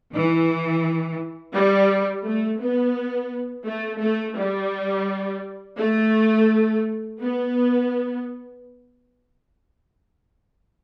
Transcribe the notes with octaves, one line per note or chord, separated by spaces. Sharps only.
E3
G3
A3
B3
A3
A3
G3
A3
B3